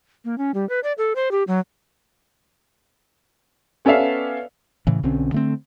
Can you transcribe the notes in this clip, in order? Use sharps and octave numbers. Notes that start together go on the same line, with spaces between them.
A#3
C#4
G3
B4
D5
A4
C5
G4
F#3
B3 C#4 A4 D5 E5 F5
A2 C#3 E3
B1 D3 C4 C#4
D3 A3 C4